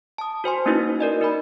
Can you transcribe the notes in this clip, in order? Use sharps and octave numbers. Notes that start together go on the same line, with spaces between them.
A5 D#6
F#4 C5 G#5 C6
A#3 C#4 D#4 E4 F#4 B4
A#4 D5 D#5
D#4 A#4 B5